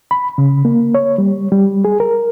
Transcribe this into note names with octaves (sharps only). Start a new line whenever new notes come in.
B5
C#3
A#3
C#5
G3
G3
G#4
A#4